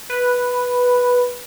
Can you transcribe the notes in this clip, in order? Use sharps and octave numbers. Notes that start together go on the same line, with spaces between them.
B4